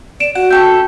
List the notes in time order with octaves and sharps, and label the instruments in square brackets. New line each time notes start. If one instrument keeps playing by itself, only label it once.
[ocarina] D5 [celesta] D7 E7
[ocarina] F#4 [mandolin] F#5
[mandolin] C#4 A4 E5 [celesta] G5 G6